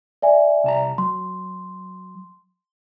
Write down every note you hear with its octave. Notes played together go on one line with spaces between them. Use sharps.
D5 E5 G#5
C2 A5 A#5
F#3 C6